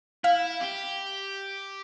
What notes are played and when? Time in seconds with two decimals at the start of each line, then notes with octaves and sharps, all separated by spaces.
0.24 E4 F5
0.61 G4